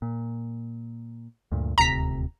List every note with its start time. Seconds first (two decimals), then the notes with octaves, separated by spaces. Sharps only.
0.02 A#2
1.52 D2 G2 A#2
1.78 D#1 D2 C3 A#5 B6